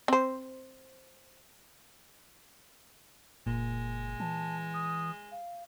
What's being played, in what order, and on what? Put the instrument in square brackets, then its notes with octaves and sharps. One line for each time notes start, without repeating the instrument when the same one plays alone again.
[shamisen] C4 C5
[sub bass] F#1 [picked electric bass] A#2 [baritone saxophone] G#3
[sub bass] E3 [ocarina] A5
[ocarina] D#6
F5